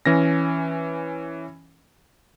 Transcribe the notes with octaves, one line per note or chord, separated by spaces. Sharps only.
E3 C#4 A#6